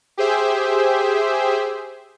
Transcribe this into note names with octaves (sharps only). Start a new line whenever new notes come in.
G4 G#4 C5 E5